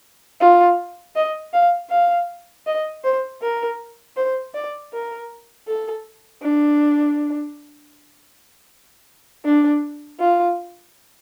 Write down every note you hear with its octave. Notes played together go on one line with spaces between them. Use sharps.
F4
D#5
F5
F5
D#5
C5
A#4
C5
D5
A#4
A4
D4
D4
F4